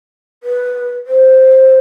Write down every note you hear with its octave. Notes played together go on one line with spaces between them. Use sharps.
B4
C5